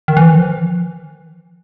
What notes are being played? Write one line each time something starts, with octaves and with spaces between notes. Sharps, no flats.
D#3
E3
D#3
F3